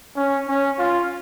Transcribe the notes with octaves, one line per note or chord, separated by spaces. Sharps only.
C#4
C#4
F4